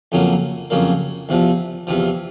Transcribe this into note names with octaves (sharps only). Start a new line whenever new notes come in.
F2 C#3 F#3 A#3
F2 C#3 F#3 A#3
E2 C3 F3
E2 C3 F3